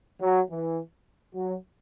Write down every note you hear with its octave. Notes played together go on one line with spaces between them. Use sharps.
F#3
E3
F#3